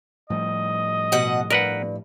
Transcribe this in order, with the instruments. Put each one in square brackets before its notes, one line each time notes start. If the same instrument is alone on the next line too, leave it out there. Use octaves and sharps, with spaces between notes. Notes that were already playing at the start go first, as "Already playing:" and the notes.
[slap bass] A2 F3 G3 [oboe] D#5
[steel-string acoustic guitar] B2 F#5
[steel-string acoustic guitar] G2 [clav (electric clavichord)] A#4 B4 F#5